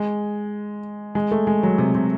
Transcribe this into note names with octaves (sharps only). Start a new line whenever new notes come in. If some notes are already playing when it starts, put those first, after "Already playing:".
Already playing: G#3
G#3
A3
G#3
F#3
C3
C3